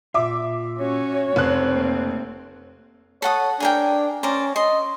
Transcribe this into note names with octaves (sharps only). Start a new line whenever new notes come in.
A#2 F4 E5 D6
C#4 F#4 C#5
F1 G#3 C4 C5 F#6
A3 A#3
A4 C#5 F#5 D#6
D4 G#4 A#4 G5
C#4 A#4 C5 D5
D#5 C6